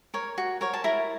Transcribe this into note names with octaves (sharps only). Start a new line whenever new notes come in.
A#4 C#5
F#4
A#4 C#5
A5
E4 A#4 A#5